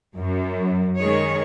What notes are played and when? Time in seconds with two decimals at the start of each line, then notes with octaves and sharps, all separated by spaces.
0.16 F#2
0.99 D#3 G#3 G#4 C#5